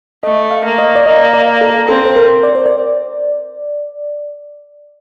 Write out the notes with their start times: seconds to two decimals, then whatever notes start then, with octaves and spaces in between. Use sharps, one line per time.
0.23 A3 D#5
0.51 F5
0.65 A#3
0.78 D#5
0.95 D5
1.06 A#3 D#5
1.33 D5
1.61 A4
1.88 C4 A4
2.06 C5
2.16 A#4
2.43 D5
2.55 C5
2.66 D5